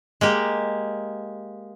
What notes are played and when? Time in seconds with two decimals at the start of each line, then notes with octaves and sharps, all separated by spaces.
0.21 G#3 A#3 G4